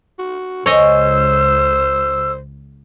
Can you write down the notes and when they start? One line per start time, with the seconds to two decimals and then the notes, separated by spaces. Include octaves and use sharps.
0.19 F#4
0.66 C#2 C5 C#5 D#5 G#5 E6